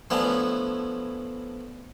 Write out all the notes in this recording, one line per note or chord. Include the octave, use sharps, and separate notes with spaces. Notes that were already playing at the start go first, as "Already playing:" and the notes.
A2 F3 B3 C#4 D4 E4